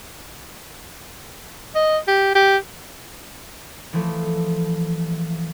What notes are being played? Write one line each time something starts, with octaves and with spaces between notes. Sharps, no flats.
D#5
G4
G4
E3 F3 A3